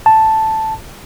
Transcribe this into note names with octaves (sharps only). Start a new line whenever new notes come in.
A5